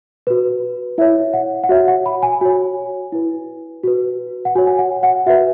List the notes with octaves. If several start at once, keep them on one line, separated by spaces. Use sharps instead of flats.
F#4 B4
E4 C#5 E5
F#5
F#5
F#4 C#5 E5
F#5
B5
G#5
F#4 C#5 G#5
E4 B4
F#4 B4
F#5
F#4 C#5 G#5
G#5
F#5
F#5
F#4 B4 E5